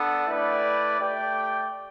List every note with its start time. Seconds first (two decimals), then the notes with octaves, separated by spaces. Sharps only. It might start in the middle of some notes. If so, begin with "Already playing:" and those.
Already playing: B3 D4 A4
0.26 A3 E4 B4 D5 G5
0.98 A3 G4 D5 G5